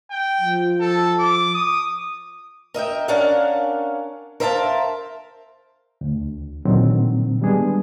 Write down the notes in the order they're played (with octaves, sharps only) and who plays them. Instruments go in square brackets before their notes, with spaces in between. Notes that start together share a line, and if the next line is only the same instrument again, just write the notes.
[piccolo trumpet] G5
[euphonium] F3
[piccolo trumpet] A4
D6
D#6
[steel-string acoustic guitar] A#4 D#5 E5 G5
C#4 D4 A#4 F5 F#5
A#4 C5 E5 F5 G#5 A5
[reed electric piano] D2
A#2 D3 D#3 F#3 C4
G3 G#3 B3 D4 G#4